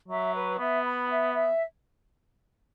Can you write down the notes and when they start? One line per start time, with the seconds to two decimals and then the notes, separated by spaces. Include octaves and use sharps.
0.08 F#3 E5
0.33 B4
0.58 B3 E5
0.84 B5
1.09 E5
1.34 E5